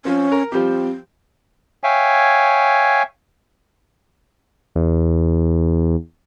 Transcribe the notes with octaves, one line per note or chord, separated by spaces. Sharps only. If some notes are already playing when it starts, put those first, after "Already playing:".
F3 C4 C#4
A#4
F3 G3 C4 G4
C#5 E5 F5 G5 G#5
E2